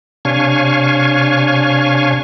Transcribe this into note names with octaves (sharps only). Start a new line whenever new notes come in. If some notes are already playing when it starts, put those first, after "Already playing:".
C3 D4 C#5 F5 G#5 C#6